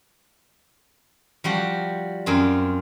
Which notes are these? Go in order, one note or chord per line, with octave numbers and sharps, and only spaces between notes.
F3 G3 F#4
F#2 C4 F4